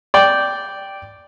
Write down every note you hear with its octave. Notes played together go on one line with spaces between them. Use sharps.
D5 G5